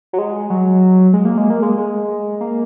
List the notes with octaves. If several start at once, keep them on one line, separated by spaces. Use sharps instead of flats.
F#3
G#3
F#3
G#3
A#3
G#3
A#3
G#3
G#3
A#3